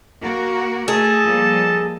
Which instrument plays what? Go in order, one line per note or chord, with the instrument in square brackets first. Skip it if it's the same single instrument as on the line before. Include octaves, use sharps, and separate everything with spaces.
[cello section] A#3 F#4 A#4
[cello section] A3 [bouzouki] G#4 [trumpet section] A4 D#5 A5
[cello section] F3 G3 A#3